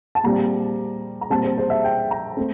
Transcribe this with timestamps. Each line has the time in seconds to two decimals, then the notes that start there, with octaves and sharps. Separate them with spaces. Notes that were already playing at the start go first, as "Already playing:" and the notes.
0.15 A5
0.23 A#2 G3 C4 A#5
1.21 A#5
1.30 A#2 G3 C4 A5
1.43 C5
1.58 C5
1.70 E5
1.84 G5
2.11 A#5
2.37 A3 C4